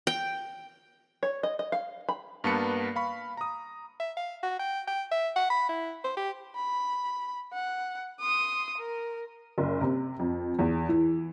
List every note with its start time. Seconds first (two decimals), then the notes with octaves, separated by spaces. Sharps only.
0.07 G5
1.23 C#5
1.43 D#5
1.59 D#5
1.72 F5
2.09 B5
2.44 G2 A#3 B3 B4 A5 C#7
2.96 F5 B5 C#6
3.37 A#5 D#6
4.00 E5
4.17 F5
4.43 F#4
4.59 G5
4.88 G5
5.11 E5
5.36 F#5
5.50 B5
5.69 E4
6.04 C5
6.17 G4
6.56 B5
7.54 F#5
8.20 C6 D#6
8.78 A#4
9.58 F#1
9.81 C3
10.19 F2
10.59 E2
10.89 E3